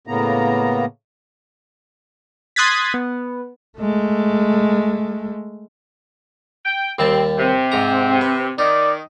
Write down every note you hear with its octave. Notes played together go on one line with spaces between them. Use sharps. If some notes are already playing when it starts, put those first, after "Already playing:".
A2 C#3 A#3 B3 A#5
C6 D#6 F#6 G#6 A6 B6
B3
G#3 A3
G5
D#2 G3 C4 A5
C3 C4
G#2 A#5
B4
D#3 D#4 D5